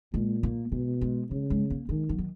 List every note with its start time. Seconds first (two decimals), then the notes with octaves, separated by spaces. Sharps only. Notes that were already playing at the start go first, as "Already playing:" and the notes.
0.14 A#2 G#3
0.43 A#3
0.72 B2 G#3
1.01 G#3
1.30 C#3 G#3
1.50 G#3
1.70 A#3
1.89 D#3 G#3
2.09 F#3
2.18 D#3